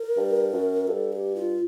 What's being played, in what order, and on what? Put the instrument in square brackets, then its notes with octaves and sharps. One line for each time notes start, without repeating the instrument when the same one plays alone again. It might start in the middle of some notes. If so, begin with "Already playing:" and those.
Already playing: [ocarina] A#4
[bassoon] G2
F#2
[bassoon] G2 [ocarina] A4
[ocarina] G4
F4